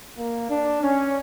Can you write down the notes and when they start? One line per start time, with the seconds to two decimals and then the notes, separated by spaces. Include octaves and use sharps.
0.17 A#3
0.49 D4
0.81 C#4